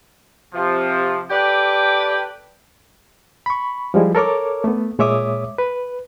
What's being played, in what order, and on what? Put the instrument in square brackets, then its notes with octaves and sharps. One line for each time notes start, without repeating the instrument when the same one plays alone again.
[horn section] C3 F3
G4 A4 B4 D5 G5
[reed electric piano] B5 C#6
F3 G3 G#3 E4
A4 A#4 C#5 D6
A3 B3
A#2 G#3 C#5 E5 D6 D#6
B4